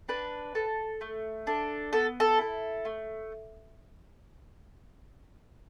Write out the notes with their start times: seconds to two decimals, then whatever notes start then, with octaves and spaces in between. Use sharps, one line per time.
0.09 D4 B4
0.55 A4
1.01 A3
1.47 D4 A4
1.93 B3 A4
2.20 A4
2.39 E4 A4
2.85 A3